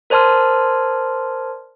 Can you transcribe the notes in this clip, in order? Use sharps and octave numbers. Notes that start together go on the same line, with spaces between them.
A#4 C5 D5 A5 C6 F6